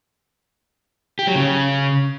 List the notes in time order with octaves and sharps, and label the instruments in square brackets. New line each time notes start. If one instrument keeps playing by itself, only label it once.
[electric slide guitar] G4
F#3
C#3